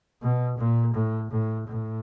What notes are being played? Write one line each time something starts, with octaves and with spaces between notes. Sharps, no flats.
B2
A#2
A2
A2
A2